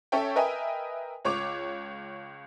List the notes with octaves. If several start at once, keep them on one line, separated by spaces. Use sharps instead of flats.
C#4 A4 C#5 E5 G5
A#4 B4 D#5 E5 G5 G#5
C#2 C#5 C#6 D6 F7